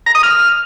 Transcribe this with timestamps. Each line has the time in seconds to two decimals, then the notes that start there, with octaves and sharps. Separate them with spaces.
0.06 A#5
0.15 D#6
0.23 F6